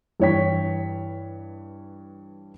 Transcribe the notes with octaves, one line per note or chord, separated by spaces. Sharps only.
G2 E3 C#5 G5 B6